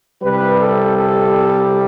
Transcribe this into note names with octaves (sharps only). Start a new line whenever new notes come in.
C2 C3 G3 B4
A4
A4